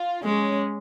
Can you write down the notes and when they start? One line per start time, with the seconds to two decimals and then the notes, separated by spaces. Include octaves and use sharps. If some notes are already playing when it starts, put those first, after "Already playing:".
Already playing: F4
0.24 G#3 C#4